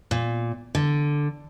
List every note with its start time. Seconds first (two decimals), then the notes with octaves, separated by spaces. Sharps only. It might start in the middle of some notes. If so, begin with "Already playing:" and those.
0.11 A#2
0.75 D3